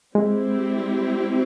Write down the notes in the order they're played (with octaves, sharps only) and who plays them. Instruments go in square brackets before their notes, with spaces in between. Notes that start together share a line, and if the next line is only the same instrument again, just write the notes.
[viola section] G3 C4 E4 G4 [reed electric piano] G#3